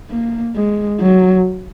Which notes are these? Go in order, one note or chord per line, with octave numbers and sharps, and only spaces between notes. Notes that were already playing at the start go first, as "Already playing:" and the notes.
A#3
G#3
F#3